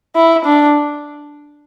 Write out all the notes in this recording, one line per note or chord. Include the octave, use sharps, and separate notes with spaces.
E4
D4